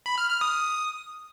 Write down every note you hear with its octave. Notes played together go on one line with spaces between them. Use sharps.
B5
F6
F6
D#6